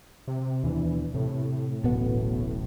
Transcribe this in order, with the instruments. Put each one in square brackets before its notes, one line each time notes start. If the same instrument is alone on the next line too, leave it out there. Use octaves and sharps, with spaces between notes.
[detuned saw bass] C3
[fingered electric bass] D#2 B2 D4 [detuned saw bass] E3
[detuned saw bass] A2 [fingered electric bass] C3
[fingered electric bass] D1 A1 [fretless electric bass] B2 B3